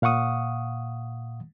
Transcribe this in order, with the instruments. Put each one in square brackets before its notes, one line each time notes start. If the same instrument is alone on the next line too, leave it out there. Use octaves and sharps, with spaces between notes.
[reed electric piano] A#2 F5 F#5 C#6 D#6